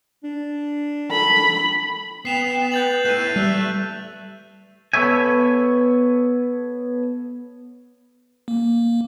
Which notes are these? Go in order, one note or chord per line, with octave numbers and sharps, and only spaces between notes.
D4
A4 B5
B3 G5 C7 E7 F7
B4 G6 A6 F#7
A3 E4 G6 D#7
G3 A3 E5 F#6
B3 A4 C#5 E5 G#5
A#3